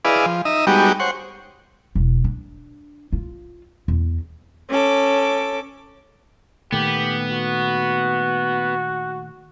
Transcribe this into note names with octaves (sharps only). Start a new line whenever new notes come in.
E4 G#4 B4 D5 D#5 F5
F3
D#4 D#5 E5
G3 G#3 B3 D#4 F#4 G4
C5 C#5 F#5
E1
D4
F4
E2
C#4 A4 D6
A#2 D#3 A3 B3 G4
F#4